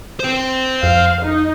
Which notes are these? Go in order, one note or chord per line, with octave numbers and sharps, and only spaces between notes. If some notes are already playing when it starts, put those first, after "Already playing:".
C5 G5
F2 F5
D#4